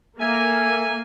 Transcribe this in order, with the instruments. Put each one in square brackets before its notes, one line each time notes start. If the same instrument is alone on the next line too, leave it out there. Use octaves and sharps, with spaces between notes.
[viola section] A#3 [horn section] A4 E5 G#5